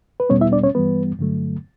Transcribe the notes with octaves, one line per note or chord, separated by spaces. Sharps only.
B4
E2 B2 G3 B3 C#4 C#5
E4 E5
D4 D5
C#4 C#5
G2 E3 G3 B3 B4
G2 D3 F#3 A3